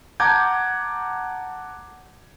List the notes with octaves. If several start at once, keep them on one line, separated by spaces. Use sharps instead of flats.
F#5 A5 A#5 D6 G6 G#6